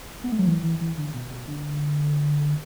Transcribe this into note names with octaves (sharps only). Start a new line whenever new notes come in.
B3
A3
F#3
E3
E3
E3
D3
B2
B2
D3